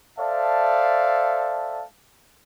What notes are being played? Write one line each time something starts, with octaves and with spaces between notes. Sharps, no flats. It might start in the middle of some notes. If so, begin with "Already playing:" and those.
A4 C5 D5 E5 F5 A5